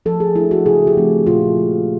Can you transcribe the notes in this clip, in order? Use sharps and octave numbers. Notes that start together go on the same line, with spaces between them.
F3 A4
G#4
A3 D4 E4
F#4
C#3 G#4
G4
F3 A3 C4 D#4
A#2 F4
F3 G#3